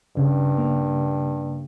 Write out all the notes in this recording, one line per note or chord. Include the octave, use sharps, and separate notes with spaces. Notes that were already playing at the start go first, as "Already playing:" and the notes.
G2 C#3
A#3